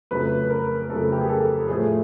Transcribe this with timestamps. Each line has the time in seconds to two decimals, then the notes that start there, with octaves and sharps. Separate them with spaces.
0.11 F2 C#3 F#3 A3 B4
0.50 A#4
0.89 F2 C#3 F#3 A3 A4
1.12 G4
1.21 G#4
1.29 A4
1.68 A2 F3 A3 G#4